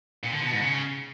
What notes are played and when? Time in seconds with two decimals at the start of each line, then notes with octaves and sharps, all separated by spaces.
0.24 A#2
0.33 D3
0.42 B2
0.51 G#2
0.60 C#3